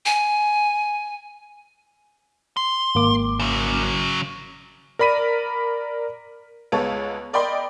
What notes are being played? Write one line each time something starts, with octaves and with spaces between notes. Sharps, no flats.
G#5
C6
G#1 A#3 D6
C#3 F#3
A#4 D5 B5 B6 D#7
C#2 G#3 B3 C#5 A5
A#4 D5 D#5 G5 B5 C6